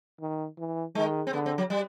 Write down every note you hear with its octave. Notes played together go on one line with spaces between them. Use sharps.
D#3
E3
D#3 G#3
C4
D3 B3
C4
F#3
G3